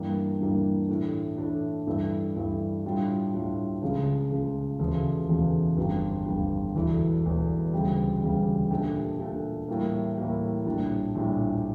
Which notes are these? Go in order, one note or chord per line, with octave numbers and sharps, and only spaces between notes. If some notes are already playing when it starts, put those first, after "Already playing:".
Already playing: G2 E3 G3 A#3 D4
G2 E3 G3 A#3 D4
A2 E3 A3 D4
A2 E3 A3 D4
G2 E3 A3
G2 E3 A3
A2 G3 D4 F4
A2 G3 D4 F4
C#2 C#3 F3
C#2 C#3 F3
E1 E2 C#3 F3 A3
E1 E2 C#3 F3 A3
G1 F2 D3 G3
G1 F2 D3 G3
E1 E2 E3 A3
E1 E2 E3 A3
E1 D2 C#3 G3
E1 D2 C#3 G3
A#2 A3 D4 G4
A#2 A3 D4 G4
A2 E3 G3 A#3
A2 E3 G3 A#3
A#1 A2 G3 D4
A#1 A2 G3 D4